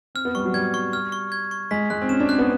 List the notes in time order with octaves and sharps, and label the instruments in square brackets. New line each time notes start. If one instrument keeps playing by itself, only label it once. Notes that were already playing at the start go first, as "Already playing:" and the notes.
[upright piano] C4 [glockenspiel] F6
[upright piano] B3
[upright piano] G3 [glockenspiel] C#6
[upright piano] F#3
[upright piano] G3 [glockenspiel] G#6
[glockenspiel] C#6
F6
C#6
G#6
C#6
[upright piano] G#3 [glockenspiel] B6
[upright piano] G#3 [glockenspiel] F#6
[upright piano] C4
[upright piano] C#4 [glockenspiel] E7
[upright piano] D4
[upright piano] C4 [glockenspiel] F#6
[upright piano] B3